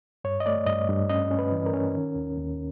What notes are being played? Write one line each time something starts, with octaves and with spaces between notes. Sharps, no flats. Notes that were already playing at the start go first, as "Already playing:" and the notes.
G2 C#5
D#5
A3 D5
G2 D#5
G2
C#4 D#5
C#4
B4
E3
A#4
C#4
D#3
D#2
D#2